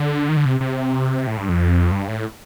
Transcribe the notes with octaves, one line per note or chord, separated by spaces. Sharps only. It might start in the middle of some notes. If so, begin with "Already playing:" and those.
Already playing: D3
D#3
D3
C3
C3
A2
G2
F2
G2
A2